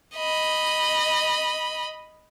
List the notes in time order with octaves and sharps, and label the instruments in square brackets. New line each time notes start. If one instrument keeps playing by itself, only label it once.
[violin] D#5 B5